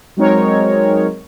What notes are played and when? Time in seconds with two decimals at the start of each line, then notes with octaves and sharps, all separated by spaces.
0.16 F#3 G#3 C4 D#4 A#4 C#5